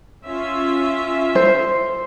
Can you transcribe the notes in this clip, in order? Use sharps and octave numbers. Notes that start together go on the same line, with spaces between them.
C#4 F4 E5
C5